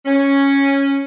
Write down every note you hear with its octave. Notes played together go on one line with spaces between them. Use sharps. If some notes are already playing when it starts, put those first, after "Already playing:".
C#4